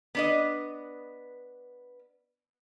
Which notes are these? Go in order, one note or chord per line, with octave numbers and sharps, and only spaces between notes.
B3 D4 D#5